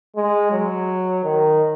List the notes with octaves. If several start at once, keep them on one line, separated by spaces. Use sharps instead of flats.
G#3
F#3
D#3